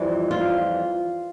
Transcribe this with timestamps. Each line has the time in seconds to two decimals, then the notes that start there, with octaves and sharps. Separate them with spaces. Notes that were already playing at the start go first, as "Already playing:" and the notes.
Already playing: F2 E3 G3
0.31 F4